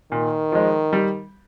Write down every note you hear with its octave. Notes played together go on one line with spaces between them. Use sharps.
A#2 D#3
F3 G#3
G3